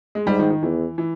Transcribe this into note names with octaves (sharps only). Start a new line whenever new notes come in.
G#3
G#2 G3
D#3
D#3
E2 E3
E3